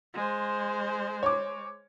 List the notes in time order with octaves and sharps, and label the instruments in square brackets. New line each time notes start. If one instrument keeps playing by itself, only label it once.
[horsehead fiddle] G#3 C5
[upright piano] C#5 D6